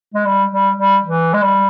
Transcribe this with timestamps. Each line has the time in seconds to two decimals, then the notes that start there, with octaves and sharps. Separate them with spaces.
0.14 G#3
0.26 G3
0.52 G3
0.78 G3
1.04 E3
1.33 G#3
1.42 G3